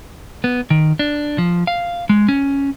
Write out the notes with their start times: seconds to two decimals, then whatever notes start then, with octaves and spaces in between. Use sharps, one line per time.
0.44 B3
0.70 D#3
0.99 D4
1.38 F3
1.67 F5
2.09 G#3
2.28 C#4